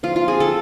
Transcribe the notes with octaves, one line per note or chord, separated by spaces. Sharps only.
F3 F4
F4
C4 G#4
A4